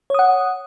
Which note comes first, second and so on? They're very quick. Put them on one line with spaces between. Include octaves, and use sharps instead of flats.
C#5 D#6 F#5